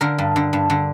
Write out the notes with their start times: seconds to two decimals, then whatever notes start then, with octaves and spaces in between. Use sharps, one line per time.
0.01 D3 A#4
0.18 G2
0.36 D3
0.53 G2
0.70 D3